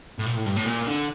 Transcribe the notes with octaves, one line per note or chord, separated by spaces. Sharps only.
A2
A#2
A2
G2
A2
A#2
D3